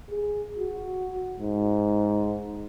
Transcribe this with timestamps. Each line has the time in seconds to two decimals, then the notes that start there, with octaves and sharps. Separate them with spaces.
0.11 G#4
0.59 F#4
1.40 G#2